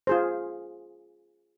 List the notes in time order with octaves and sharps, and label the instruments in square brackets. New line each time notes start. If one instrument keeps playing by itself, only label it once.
[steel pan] F4 G#4 C5